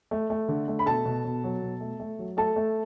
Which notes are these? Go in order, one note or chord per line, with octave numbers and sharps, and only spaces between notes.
A3
A3
D3
A3
B5
B2 A4 A5
B2
B2
F#3
B2
A3
A3
F#3
A3 A4 A5
A3